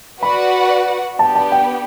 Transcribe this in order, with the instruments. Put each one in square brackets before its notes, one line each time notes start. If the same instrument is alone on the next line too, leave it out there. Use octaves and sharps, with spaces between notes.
[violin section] F#4 B4 D5 F#5 [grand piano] B5
[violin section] B3 D4 G4 [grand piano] A5
[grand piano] A5
G5